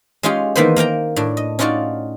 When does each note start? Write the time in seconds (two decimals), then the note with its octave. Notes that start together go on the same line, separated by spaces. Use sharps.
0.23 G#3 C#4 F4 G4 G#4
0.56 D#3 E3 A#3 B3 B4 C5
0.76 A#3 A#4 G5 A#5
1.16 A2 D4
1.37 D#5
1.59 C#4 D#4 F4 F#4 D5